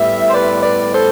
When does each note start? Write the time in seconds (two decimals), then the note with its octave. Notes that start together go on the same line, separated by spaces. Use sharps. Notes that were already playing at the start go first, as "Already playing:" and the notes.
Already playing: A2 G3 B3 E5
0.29 C5
0.34 B4 D5
0.63 B4 D5
0.92 A4 C5